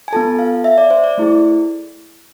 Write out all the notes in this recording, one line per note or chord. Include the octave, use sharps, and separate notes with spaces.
G#5
B3 F4 A4 A5
F5
E5
D5
C5
D5
A3 E4 G#4